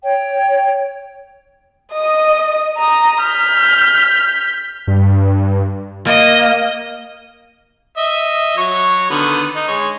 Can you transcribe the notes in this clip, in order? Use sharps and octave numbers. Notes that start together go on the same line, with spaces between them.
C#5 G5
D#5 D#6
A#5 D#6
F6 G6 B6
G2
A#3 D#5
D#5 E5
F#3 C#5 C#6
D3 D#3 B3
D#4
G#3 C#5